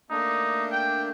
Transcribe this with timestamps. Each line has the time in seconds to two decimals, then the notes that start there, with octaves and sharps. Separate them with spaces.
0.10 A3 A#3 D4 D#4
0.72 G5